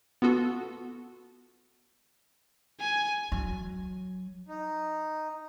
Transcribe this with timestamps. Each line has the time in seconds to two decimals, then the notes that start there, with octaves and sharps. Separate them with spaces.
0.22 B3 F4 F#4 A4
2.80 G#5
3.32 F#3
4.48 D#4